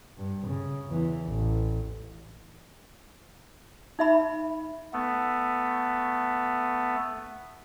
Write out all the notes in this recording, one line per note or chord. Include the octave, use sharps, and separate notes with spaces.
G2
C#3
E2 E3
A1
D#4 E5 B5
A3 B3